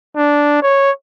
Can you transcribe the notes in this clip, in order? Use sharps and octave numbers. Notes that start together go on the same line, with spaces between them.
D4
C#5